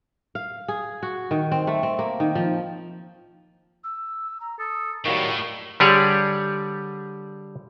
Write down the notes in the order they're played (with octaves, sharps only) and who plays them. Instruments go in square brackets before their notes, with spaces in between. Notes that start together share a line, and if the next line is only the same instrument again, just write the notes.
[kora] F5
G#4
F#4
D#3
C4
A3
C4
A#3
D#3
F3
[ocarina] E6
A#5
[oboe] A4 [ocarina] D#6
[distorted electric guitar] A2 [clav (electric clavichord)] D#3 F#3 G3 [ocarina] F5 [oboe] C#6
[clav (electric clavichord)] D3 G3 G4 G#4 C#5 D5